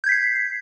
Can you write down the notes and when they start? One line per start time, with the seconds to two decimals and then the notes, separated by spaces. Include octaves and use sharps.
0.04 G6
0.06 G#6
0.09 B6
0.12 C7